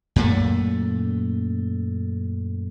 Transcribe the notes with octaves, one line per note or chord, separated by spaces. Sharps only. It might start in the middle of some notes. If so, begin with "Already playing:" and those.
F#2 A#2 A3